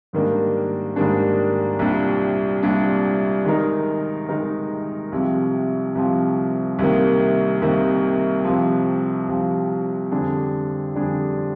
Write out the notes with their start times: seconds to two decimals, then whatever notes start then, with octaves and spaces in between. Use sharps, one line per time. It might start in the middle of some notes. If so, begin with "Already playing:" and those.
0.13 G#2 D#3 G3 A#3 D4
0.96 G#2 D#3 G3 A#3 D4
1.79 C2 A#2 G3 D4
2.63 C2 A#2 G3 D4
3.45 D#3 G#3 D#4 A#4
4.29 D#3 G#3 D#4 A#4
5.12 C2 C3 F3
5.95 C2 C3 F3
6.79 C2 C3 D#3 A#3
7.62 C2 C3 D#3 A#3
8.44 C2 C3 F3
9.28 C2 C3 F3
10.11 F2 D3 G3 D4 G#4
10.94 F2 D3 G3 D4 G#4